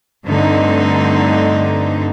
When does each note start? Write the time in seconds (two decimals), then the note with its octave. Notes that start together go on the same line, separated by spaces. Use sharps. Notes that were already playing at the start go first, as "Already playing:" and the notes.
0.25 G2 D3 A3 C4 D#4